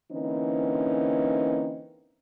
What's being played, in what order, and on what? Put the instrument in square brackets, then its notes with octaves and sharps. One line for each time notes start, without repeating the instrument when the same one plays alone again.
[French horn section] D3 E3 A#3 C4 C#4 D#4